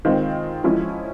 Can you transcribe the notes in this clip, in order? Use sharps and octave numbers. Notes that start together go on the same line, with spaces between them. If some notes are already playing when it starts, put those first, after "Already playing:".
D#3 G#3 C4 F4
F3 G#3 C#4 E4